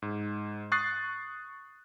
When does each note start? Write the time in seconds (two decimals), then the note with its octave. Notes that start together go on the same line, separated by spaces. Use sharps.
0.02 G#2
0.72 C#6 D#6 F#6 A6 C7